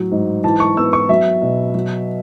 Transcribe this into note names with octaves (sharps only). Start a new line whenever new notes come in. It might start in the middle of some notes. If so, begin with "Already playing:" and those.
Already playing: A2 F#3
G#2
E3 A5
C#6
B3 E6
C#6
F#3 E5
B2
F#3